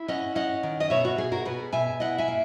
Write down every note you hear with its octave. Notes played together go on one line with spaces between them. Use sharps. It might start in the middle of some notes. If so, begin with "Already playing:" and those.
Already playing: E4
C#4 D#5 F#5
C#4 D#5 F#5
D#3
D#5
B2 C#5 E5
F#4
B2 G#4
F#4 A#4
B2 G#4 B4
B2 E5 G#5
E4 D#5 F#5
E5 G#5
A#3